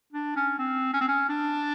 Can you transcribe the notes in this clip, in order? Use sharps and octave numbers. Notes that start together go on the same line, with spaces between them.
D4
C#4
C4
C#4
C4
C#4
D4